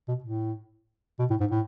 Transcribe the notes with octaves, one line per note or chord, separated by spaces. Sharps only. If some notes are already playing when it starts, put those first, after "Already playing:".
B2
A2
B2
A2
G#2
A2